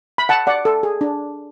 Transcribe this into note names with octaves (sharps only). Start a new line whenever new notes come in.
B5
F#5 A5
D5 F#5
A4
G#4
D4